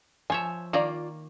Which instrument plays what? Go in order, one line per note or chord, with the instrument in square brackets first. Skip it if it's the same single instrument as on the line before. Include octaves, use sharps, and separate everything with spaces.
[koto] F3 C#5 E5 [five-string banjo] G#5
[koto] D#3 A#3 A#5 [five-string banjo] F4 D5